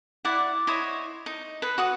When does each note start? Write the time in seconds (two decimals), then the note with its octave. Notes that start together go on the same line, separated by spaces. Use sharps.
0.25 E4 D5 F#5
0.67 E4 C5 C#5 D#5
1.26 D#4
1.62 D#4 B4
1.78 F#4 F#5 D#6